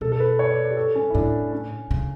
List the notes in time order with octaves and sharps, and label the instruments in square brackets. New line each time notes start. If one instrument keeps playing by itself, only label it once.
[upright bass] B2 [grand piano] A4
[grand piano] A4
B4
C#5
D5
D5
G4
A4
C#4
E4
[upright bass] A2 [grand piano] D4
[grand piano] C#4
[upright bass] C#3